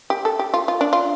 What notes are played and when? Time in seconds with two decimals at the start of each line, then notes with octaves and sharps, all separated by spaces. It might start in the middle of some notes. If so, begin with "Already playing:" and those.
0.10 G4
0.25 A4
0.39 G4
0.54 F4
0.68 F4
0.81 D4
0.93 F4